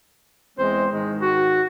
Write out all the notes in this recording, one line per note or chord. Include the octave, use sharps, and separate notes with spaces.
E2 G#3 C4 C5
G#2 D#3 G#3
F#4